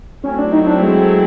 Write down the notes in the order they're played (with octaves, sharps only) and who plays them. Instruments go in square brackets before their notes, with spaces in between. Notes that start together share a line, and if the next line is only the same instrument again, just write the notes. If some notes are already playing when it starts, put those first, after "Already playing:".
[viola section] F#3 A3 C4 E4 [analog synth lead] C#4
[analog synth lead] D4
D#4
D4
G#3